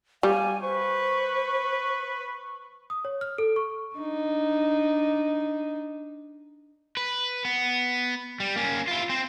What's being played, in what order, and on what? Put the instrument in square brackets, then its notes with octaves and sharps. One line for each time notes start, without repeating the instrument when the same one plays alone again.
[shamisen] G3 [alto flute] F5 [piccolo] G#5
[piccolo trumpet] B4 [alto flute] C5 [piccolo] C#6
[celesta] D#6
C#5
F6
A4
C#6
[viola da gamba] D4 D#4
[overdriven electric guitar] B4
B3
G3
A#3 C#4
E4 F4
C4 C5